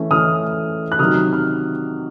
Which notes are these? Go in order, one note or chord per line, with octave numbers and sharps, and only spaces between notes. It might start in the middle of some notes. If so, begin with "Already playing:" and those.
Already playing: E3 A3 C#4
E3 A3 C#4 D#6 F6
F#6
C3 D#3 F#3 D#6 F6
F6